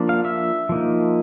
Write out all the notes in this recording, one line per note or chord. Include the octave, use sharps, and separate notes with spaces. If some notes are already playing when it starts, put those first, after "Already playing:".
Already playing: F3 A#3 D4
F5
E5
F3 A#3 D#4